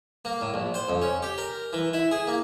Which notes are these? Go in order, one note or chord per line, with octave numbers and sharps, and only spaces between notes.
A#3
A2
A#1
C5
F2
C#4
G4
A#4
E3
E4
G#4
A#3